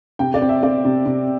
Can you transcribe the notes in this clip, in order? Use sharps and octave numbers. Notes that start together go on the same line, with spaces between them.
C3 G5
D5
C4
E5
C4 D5
C3
C3